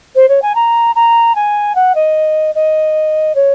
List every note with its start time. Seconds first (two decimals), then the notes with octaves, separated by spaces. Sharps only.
0.15 C5
0.29 C#5
0.42 G#5
0.55 A#5
0.95 A#5
1.35 G#5
1.75 F#5
1.95 D#5
2.55 D#5
3.35 C#5